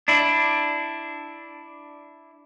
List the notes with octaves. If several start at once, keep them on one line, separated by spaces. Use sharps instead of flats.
D4 E4